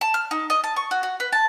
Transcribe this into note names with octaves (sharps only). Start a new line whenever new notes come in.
A5
F6
D#4
D#5
A5
C#6
F#4
F#4
B4
A5